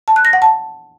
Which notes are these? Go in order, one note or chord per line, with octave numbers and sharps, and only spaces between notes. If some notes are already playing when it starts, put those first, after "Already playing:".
A5
F#6
A#6
F#5
A5